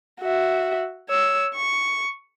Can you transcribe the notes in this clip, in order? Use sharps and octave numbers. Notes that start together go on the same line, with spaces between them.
F#4 E5
C#5 E6
C#6